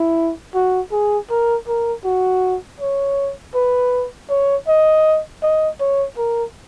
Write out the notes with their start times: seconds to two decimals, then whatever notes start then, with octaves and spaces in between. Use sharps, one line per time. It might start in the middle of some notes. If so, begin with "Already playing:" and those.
Already playing: E4
0.55 F#4
0.92 G#4
1.30 A#4
1.68 A#4
2.05 F#4
2.80 C#5
3.55 B4
4.30 C#5
4.68 D#5
5.43 D#5
5.80 C#5
6.18 A#4